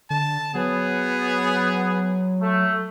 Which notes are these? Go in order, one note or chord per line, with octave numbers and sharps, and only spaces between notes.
D3 A5
F#3 B3 G#4
A3